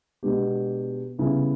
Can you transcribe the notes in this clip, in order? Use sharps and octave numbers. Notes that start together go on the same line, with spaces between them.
B2 G#3 B3 D4 G4
C#3 E3 G3 B3 E4